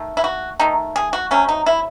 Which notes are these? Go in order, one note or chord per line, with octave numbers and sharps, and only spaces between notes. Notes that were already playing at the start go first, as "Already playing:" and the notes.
Already playing: D#3 A3
E4
F#4
D#3 A3 D#4
G#4
F#4
C3 F#3 A3 C#4
D#4
E4